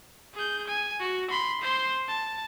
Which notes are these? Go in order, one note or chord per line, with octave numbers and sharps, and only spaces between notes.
G#4 G6
G#5
F#4
B5 C6
C5 C6
A5